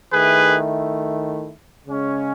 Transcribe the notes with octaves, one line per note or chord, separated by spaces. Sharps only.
D#3 A3 E4 G#4 B4
C#3 G#3 C#4